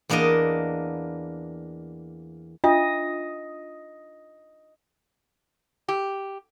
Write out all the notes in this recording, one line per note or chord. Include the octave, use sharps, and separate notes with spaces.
E2 A#3 D4 A#4 D#5
D4 F4 D#5 E5
G4